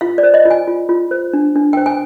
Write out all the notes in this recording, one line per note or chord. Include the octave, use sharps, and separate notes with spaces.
F4 F5
D5
C5
D#5
F4
G#5
F4
F4
C5
D4
D4
C5 G5
G#5